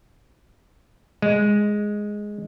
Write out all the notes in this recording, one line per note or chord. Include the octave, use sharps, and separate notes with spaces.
G#3